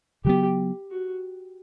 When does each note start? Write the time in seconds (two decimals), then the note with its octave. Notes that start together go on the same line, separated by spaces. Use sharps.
0.25 C#3 F#3 B3 G4
0.91 F#4